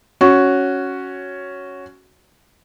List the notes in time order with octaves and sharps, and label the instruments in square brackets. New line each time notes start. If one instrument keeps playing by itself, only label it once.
[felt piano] C#4 F#4